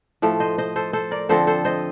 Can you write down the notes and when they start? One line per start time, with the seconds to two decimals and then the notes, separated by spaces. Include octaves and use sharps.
0.22 A2 F3 A3
0.40 C5 D#5
0.58 C5 D#5
0.76 A4 C5
0.93 A4 C5
1.11 A#4 D5
1.29 D3 F3 C4 A4 C5
1.47 A4 C5
1.65 C5 D#5